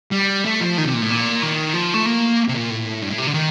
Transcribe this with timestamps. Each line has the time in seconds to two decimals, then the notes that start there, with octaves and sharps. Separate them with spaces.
0.12 G3
0.46 A3
0.61 F3
0.78 D#3
0.85 C3
0.94 A#2
1.02 A2
1.10 A#2
1.42 D#3
1.74 F3
1.94 A3
2.06 A#3
2.48 C3
2.54 A#2
2.70 A2
3.02 G2
3.11 A2
3.18 C3
3.27 D3
3.34 D#3